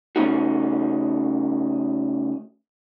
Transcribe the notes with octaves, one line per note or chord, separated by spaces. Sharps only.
C#3 A3 C#4 D#4 F#4